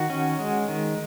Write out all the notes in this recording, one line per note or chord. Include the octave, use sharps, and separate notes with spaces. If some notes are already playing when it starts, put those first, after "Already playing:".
Already playing: D#3 F#4
C#4
G#3
D#3